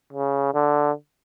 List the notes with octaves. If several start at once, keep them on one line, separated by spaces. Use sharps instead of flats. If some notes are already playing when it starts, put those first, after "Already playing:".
C#3
D3